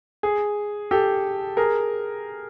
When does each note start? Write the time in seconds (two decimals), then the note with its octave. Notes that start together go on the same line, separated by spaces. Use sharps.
0.23 G#4
0.91 G4 A4
1.57 G#4 A#4